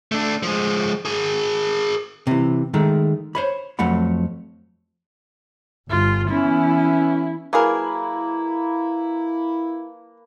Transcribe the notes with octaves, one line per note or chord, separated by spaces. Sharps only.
A3 D4
F3 G#3
G#4 A#4
C3 E3
D#3 G#3 A3
C5 C#5 B5
F2 F#3 A3 F#5 B5
G1 F4
E3 B3 C#4 E4
F#3 A#3 E4 G#4 A#4 B4 A5 A#5